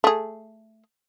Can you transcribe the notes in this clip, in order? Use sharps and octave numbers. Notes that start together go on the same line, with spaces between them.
A3 G#4